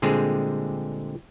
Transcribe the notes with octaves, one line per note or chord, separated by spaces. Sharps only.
A#2 D3 G3 G#3 C4 G#4